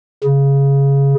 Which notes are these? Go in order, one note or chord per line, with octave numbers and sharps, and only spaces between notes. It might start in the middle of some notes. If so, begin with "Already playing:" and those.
C#3